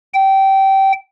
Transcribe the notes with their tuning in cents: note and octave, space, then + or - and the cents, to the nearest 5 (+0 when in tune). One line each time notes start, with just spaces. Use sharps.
G5 -20